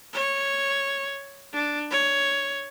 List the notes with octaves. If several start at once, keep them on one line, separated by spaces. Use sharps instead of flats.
C#5
D4
C#5